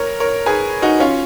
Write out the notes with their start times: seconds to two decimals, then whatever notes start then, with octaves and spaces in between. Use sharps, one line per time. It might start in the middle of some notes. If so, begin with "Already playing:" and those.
Already playing: A#4 C#5
0.20 A#4 C#5
0.46 G#4 B4
0.82 D#4 F#4
1.00 C#4 F4